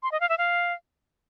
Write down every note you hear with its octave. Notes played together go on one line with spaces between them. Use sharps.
C6
D#5
F5
E5
F5